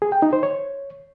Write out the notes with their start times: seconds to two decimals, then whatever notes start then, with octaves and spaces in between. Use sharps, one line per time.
0.02 G#4
0.12 G5
0.22 D#4
0.33 C5
0.43 C#5